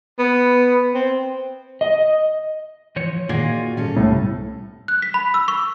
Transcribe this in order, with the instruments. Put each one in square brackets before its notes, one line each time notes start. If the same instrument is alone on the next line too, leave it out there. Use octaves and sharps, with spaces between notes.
[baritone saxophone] B3
C4
[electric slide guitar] D#5
[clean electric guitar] E3 F3 C#5
[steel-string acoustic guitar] A#2 D#3 F#4 [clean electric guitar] A#3 F4 G#4
[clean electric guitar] G2 [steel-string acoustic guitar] C#4 A4
[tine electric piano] C2 [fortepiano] A2
[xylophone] F#6
B6
B5
E6
C#6